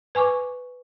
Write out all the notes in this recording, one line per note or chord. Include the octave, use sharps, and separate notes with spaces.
B4 G#5 C#6 D6